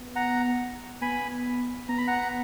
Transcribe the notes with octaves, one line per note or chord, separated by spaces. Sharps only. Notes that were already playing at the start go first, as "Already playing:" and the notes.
Already playing: B3
F#5 A#5
B3 G#5 B5
B3 A#5
B5
F#5 A#5